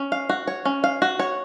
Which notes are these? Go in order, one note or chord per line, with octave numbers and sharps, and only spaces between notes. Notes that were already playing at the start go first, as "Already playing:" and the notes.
Already playing: C#4
F5
F#4
C#5
C#4
F5
F#4
C#5